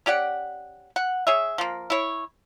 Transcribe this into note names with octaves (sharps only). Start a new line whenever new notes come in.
C#4 G4 D5 F#5
F#5
G#4 C#5 E5
F3 A#3
E4 C#5